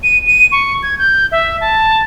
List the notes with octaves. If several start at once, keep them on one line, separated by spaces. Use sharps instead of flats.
D#7
D#7
C#6
G#6
G6
E5
A5